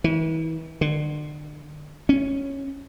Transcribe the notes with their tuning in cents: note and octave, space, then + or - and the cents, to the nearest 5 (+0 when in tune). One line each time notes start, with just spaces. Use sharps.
E3 -35
D3 +35
C#4 -5